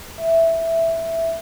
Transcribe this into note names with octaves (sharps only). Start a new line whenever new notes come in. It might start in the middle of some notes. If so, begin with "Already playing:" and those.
E5